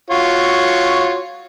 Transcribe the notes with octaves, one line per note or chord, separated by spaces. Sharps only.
F4 F#4 C#5